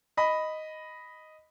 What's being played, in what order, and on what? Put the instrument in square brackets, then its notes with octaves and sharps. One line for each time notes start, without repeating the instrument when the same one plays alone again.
[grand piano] D#5 B5